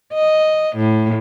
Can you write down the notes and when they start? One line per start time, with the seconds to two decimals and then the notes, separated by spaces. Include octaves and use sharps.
0.14 D#5
0.76 A2